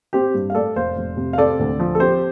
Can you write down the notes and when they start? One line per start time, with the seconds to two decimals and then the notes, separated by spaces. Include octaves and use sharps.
0.13 C4 G4 C5
0.34 G2
0.50 F5
0.55 A3 A4 D5
0.76 F1 C5 F5
0.96 F1
1.17 C3
1.33 F5
1.38 C4 A4 D5
1.59 D2
1.80 F3
1.95 A4
2.00 C4 G4 C5